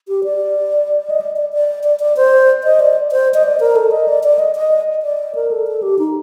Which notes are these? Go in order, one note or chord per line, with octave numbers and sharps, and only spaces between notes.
G4
D5
D#5
D5
D5
D5
D5
D5
C5
D#5
D5
C5
D#5
D5
A#4
A4
D#5
D5
D5
D#5
D#5
D5
A#4
A4
A4
G4
D#4